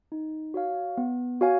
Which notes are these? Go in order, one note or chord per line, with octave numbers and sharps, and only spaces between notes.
D#4
F#4 C#5 F5
B3
F#4 C#5 F5 G#5